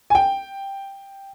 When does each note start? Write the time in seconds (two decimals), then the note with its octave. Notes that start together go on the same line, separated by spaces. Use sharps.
0.10 G#5
0.15 G5